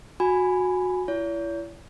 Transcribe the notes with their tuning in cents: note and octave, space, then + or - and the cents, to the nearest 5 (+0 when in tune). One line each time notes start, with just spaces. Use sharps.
F#4 -15 G#5 +0 B5 +10
E4 +30 C#5 +45